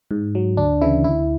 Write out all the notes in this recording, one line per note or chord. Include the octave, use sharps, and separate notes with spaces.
G#2
F#3
D2 D4
C#3 E3 E4
D2 E4